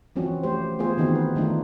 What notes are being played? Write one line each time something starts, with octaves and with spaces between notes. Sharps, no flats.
E3 F3 C4 C#4 F#4
A3 G4 C5
A3 B3 F4 G#4 C5
D#3 E3 B3 C4 D#4 F#4
B4
D#3 F3 A3 D4 D#4 F4